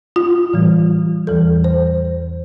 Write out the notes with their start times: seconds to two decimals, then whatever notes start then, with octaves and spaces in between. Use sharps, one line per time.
0.16 F4
0.53 A2 E3 G3
1.27 E2 E3 G3 A4
1.64 C5